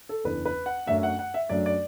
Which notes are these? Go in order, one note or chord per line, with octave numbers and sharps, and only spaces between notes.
A4
F#1 E2 E3 D4 B4
B4
F#5
F#2 F#3 A3 D4 E5
E5
F#5
F#5
E5
F#2 F#3 A3 D4 D5
D5